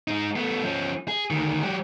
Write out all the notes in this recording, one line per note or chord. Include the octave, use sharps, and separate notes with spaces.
G#3 D#4
A3 B3
F3 C#4
G#4
D2 D#3
F#3 G4